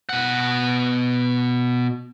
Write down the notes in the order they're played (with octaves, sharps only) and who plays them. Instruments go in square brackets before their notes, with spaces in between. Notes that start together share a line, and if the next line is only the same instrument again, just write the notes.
[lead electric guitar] B2 F#5